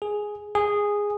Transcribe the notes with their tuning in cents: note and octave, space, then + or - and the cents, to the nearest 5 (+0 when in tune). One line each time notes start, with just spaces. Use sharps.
G#4 +5
G#4 -10